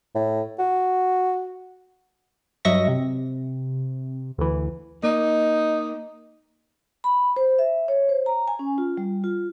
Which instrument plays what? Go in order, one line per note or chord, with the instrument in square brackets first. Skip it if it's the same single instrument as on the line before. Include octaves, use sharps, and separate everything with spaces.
[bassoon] A2
F#4
[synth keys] G2 F#3 D#5 E5 C#6 A#6
C3
D2 E3
[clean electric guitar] A#3 [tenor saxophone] D#4
[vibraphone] B5
C5
E5
C#5
C5
A#5
G#5
C#4
F4
G3
F4